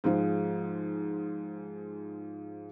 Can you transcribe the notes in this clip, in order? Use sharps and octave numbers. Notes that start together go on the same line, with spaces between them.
G#2 F3 G#3